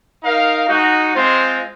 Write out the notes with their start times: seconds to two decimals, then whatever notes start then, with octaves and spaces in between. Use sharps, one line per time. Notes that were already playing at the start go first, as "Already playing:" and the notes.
0.23 D#4 A#4 F5
0.69 G#3 D#4 F#4
1.15 G#3 C4 F4 C5